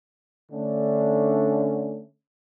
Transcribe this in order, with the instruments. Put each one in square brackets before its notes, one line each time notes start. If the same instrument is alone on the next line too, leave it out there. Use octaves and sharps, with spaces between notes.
[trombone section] D3 A3 C#4 D4